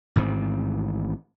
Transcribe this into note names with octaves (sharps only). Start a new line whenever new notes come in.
A1 G#2 D#3 C4